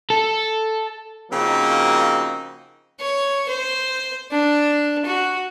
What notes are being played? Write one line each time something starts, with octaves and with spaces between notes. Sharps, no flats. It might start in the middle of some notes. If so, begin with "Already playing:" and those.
A4
C#3 F3 A#3 C4 D#4 F#4
C#5
C5
D4
F#4